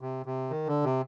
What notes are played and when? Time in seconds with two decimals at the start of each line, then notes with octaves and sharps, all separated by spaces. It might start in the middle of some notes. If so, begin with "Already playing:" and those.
0.01 C3
0.26 C3
0.50 D#3
0.67 D3
0.84 C3